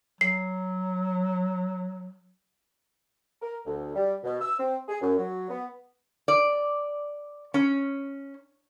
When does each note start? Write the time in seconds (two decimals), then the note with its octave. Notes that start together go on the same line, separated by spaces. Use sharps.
0.21 F#3 C7
3.42 A#4
3.66 D2
3.96 G3
4.24 B2
4.41 E6
4.59 C4
4.89 G#4
5.02 F#2
5.18 F#3
5.49 B3
6.28 D5
7.54 C#4